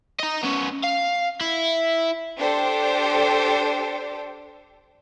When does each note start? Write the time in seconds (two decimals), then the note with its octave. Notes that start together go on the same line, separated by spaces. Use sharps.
0.20 D#5 A#5
0.43 B3 C#4
0.84 F5
1.41 E4
2.38 D4 G4 A4 C5 G5